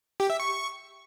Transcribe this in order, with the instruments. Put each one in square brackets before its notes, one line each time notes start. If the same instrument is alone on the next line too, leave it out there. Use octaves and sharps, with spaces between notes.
[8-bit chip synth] G4
E5
C#6